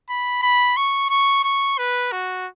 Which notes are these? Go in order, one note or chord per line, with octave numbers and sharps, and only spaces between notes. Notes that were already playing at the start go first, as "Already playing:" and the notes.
B5
B5
C#6
C#6
C#6
B4
F#4